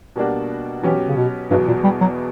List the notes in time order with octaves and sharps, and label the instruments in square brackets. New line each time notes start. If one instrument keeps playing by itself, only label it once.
[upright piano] B2 G3 A#3 D4 F#4
[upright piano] B2 F#3 C#4 G4 [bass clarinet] E3
[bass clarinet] C#3
B2
[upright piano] E2 B2 F#3 [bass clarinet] G2
[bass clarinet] A#2
G3
F#3